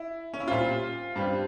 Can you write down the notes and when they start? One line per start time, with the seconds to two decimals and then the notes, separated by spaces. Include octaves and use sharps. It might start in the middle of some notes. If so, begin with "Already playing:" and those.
Already playing: E4
0.34 C#4
0.40 E4
0.48 A#2 G3 C4 F4
1.16 G2 G3 C4